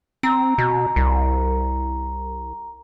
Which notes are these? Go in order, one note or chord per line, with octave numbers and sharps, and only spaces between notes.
C4 A#5
B2
C2